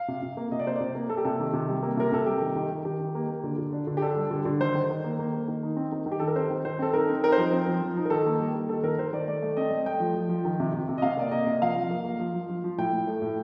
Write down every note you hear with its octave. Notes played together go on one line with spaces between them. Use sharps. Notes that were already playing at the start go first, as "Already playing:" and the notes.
Already playing: F5
C3
C3
A#3
C3 D#5
D5
A#3 C5
C3 D5
A#3
A#3 A4
G4
C3 A4
D#3
C3
G3
A#3
C3 A#4
C3 A4
G3 G4
D#3
D#3
D#3
D#3 G4
D#3
A#3
A#3
D3
D3
D4
D3
G4
D4 A4
G3
D3
D3
D#3 C5
D#3
D#3
A#3
A#3
A#3
D#3
D#4
C4
D#3
D#3
G4
D#3 A4
A#4
C4 C5
D#3
D#3 C5
C4 A4
D#4 A#4
C4
D#4 A#4
C5
F3 A#4
C4
F3
F3
D#4
A#4
D#3 A4
A#3
G3
A#3
D#3 A4
D#3 A#4
D#3 C5
D#3 D5
A3 D5
A3
C4 D#5
A3
A3 G5
F3
F3
F3
D#3
C3
C3
C3
D#5
C3 F5
A#3 D5
A#3 D#5
C3
F3 F5
F3
A#3
A#3
F3
F3
F3
F3
A2 G5
A2
A3
A2